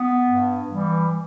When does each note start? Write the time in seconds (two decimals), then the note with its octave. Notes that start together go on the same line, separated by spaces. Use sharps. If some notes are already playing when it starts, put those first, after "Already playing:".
Already playing: B3
0.26 G2
0.68 E3 G3